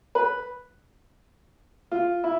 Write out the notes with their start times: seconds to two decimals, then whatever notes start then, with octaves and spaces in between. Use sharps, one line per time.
0.15 B4
1.92 F4
2.24 E4